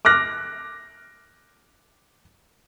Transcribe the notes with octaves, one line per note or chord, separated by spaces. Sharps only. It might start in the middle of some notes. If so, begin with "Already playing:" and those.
D6 F6 F#6 A#6